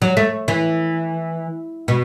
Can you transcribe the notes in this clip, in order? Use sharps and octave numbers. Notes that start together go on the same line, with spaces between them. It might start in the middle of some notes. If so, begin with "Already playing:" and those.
F#3
A3
E3
B2